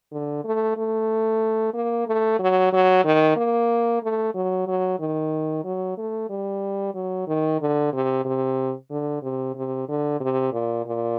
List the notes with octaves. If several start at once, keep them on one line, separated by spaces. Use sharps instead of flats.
D3
A3
A3
A#3
A3
F#3
F#3
D#3
A#3
A3
F#3
F#3
D#3
F#3
A3
G3
F#3
D#3
D3
C3
C3
D3
C3
C3
D3
C3
A#2
A#2